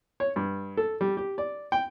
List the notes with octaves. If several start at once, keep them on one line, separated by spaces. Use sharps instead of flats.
C#5
G2
A4
G3
G4
D5
G5